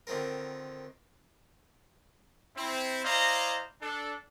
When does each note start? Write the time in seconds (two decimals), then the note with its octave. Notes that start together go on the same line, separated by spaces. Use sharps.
0.07 D3 D#3 C4 F4 A#4
2.56 C4 E4
3.04 E4 C5 D5 D#5 F5 A#5
3.81 D4 A4